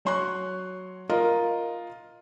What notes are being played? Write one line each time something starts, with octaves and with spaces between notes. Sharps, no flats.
F#3 C#5 C6 C#6 F#6
F4 A#4 D#5